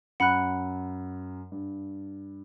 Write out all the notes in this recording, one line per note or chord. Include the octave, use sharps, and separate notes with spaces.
F#2 F#5 B5 F#6
G2